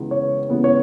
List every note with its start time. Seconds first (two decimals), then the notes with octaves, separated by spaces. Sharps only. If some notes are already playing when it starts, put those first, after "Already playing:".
Already playing: C#2 C#3 E3 B3
0.11 C#5
0.50 C#2 C#3 E3 B3
0.64 C#5